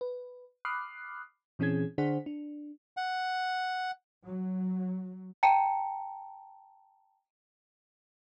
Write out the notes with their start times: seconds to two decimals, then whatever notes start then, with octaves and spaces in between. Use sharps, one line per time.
0.01 B4
0.65 B5 D6 D#6 F6 F#6 C7
1.59 A#2 E3 C4 C#4 G#4 G#6
1.98 D3 D4 G#4 C5 F#5 B6
2.26 D4
2.97 F#5
4.26 F#3
5.43 G5 A5 A#5 C#7